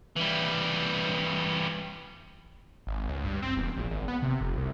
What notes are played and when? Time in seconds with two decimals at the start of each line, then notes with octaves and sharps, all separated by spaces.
0.17 E3 G3
2.87 G#1
3.08 C#2
3.25 G2
3.43 C4
3.57 E1
3.77 A#1
3.91 G#1
4.08 B3
4.22 C3
4.41 F1
4.58 C2